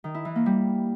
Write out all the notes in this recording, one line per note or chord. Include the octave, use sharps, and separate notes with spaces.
D#3
E4
E3
A#3
G3